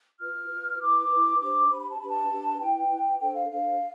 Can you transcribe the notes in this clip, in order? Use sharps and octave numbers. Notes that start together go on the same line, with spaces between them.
F4 B4 F6
F4 B4
E4 B4 D6
E4 B4
D4 G4 C5 D6
D4 G4 C5 B5
B5
A5
D4 G4 B4 B5
A5
D4 G4 B4
E4 B4 G5
E4 B4
D4 A4 C5 G5
F5
D4 A4 C5 F5